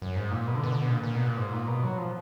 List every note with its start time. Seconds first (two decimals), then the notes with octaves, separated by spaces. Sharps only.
0.02 F#2
0.16 G#2
0.31 A#2
0.47 B2
0.55 D3
0.64 B2
0.72 D3
0.81 B2
0.91 A#2
1.03 A#2
1.15 B2
1.26 A#2
1.37 G#2
1.53 A#2
1.67 B2
1.83 F#3
1.98 F3